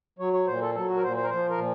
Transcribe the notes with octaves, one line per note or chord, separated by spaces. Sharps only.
F#3 C#5
C#5
A#2 C5
A4
F#3 A4
F#4
A#4
A#2 C5
C5
A#4
F3 C5
A#4
A#2